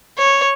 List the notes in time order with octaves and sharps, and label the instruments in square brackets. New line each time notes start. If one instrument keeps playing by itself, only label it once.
[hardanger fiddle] C#5